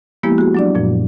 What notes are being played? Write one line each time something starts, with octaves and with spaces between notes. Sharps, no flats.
F3 G#3 A#3 B3 E4 G4
F#4 G#4
F#3 D4 D5
F#2 A#2 F3